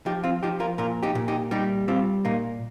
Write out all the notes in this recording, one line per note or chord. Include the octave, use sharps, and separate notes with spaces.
F3 D#4 G4
C4 F4
F3 D#4 G4
F4 A#4
A#2 F4 A#4
D#4 G4
A#2
D#4 G4
G3 D#4 G4
G3 C4 F4
A#2 A#3 D#4